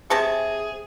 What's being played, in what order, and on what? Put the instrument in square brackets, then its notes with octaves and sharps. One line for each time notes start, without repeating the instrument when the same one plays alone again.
[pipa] C3 A5 C#6 [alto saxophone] G#4